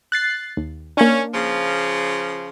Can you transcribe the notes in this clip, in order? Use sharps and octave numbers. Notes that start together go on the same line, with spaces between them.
F#6 A6 C7
D#2
A#3 C#4 D4
C#3 F3